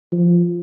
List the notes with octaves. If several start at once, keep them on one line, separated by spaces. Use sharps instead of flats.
F3